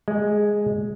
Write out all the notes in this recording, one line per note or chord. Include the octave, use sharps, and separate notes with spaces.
G#3